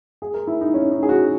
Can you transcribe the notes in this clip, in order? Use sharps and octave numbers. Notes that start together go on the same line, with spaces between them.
G#4
A#4
E4
D#4
C#4
D#4
G#4
F#4